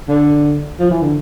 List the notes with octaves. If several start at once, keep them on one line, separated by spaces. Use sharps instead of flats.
D3
F3
E3
D3